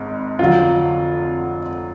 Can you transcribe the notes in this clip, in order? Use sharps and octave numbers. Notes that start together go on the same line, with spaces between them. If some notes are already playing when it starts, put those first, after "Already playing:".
Already playing: G#1 G#2
F1 F2 D3 F#3 F4